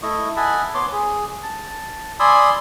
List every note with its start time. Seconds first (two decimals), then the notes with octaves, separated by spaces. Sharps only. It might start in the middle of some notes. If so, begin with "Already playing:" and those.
0.03 A3 E4 D#5 C#6
0.37 D#5 E5 F#5 G#5 A5 B5
0.74 B3 C#5 C6 D6
0.92 G#4
1.43 A5
2.20 D5 G#5 B5 C6 D#6 E6